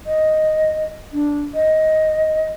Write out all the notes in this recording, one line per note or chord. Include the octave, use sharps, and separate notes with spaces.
D#5
D4
D#5